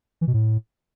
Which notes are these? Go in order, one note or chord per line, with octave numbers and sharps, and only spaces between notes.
E3
B2
A2